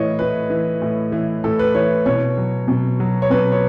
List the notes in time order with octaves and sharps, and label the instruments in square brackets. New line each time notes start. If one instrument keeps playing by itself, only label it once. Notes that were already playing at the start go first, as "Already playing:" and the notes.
Already playing: [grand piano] A2 E3 C#5 D#5
A2 B4
E3
A2
E3
A2 A4
B4
E3 C#5
B2 C#5
F#3
B2
F#3
C#5
B2 B4
C#5